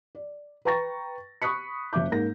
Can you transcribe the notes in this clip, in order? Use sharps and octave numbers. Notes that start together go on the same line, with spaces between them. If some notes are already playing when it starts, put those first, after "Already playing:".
D5
B4 G5 A#5 C#6 A6 A#6
B5 C#6 D#6 F#6 B6 C#7
F#1 F3 E5 D6 G6
G#2 A#3 A#6